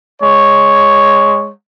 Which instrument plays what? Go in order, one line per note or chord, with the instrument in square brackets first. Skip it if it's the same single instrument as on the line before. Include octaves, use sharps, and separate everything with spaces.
[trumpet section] G#3 C#5